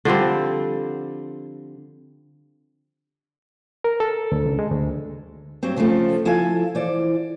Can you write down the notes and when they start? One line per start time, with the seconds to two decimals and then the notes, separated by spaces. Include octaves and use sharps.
0.05 D3 F3 G3 C4
3.84 A#4
4.00 A4
4.32 D2
4.46 C#2
4.59 G#3
4.71 D2
5.63 G2 F#3 C4
5.76 C#3 F3 G3 A3 C4
6.25 F3 E4 A4 E5 F5 G#5
6.75 E3 C5 D5